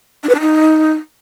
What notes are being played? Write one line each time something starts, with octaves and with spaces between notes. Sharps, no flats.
D4
B4
D4
D#4